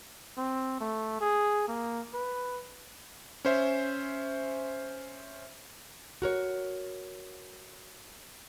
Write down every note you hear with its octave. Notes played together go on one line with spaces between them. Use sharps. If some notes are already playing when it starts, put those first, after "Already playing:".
C4
A3
G#4
A#3
B4
C#4 C5 E5
F#4 A#4 C#5